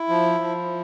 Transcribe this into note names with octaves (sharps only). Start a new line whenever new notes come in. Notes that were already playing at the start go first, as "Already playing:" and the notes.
Already playing: E4
F3
F3